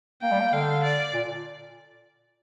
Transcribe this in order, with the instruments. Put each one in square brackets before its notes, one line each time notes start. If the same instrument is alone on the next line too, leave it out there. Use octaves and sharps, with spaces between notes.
[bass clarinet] A#3 [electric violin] G5
[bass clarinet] G3
A#3
[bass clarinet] D3 [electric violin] F5
[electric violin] D5
[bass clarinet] A#2